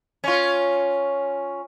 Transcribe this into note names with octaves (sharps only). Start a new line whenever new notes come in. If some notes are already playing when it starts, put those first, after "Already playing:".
C#4 F4